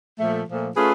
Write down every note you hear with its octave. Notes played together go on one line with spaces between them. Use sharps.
A#2 F3 A3
A#2 F3 A3
A3 C#4 F4 G#4 B4